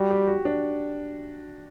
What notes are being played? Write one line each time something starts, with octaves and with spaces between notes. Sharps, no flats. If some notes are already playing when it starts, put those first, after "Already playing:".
Already playing: G3 F#4
G4
F#4
D4